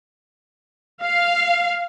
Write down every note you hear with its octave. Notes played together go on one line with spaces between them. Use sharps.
F5